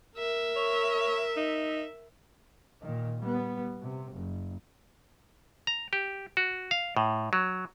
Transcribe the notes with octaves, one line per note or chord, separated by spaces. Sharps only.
A#4 E5
C#5
D#4
A#2 D#3
G3 B3
C3
F#1
A#5
G4
F#4
F5
A2
F#3